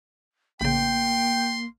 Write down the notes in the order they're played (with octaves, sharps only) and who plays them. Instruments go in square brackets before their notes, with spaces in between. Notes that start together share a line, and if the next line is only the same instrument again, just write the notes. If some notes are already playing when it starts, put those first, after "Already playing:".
[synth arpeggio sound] A1 C#3 [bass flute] A#3 [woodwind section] G5 [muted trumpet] C6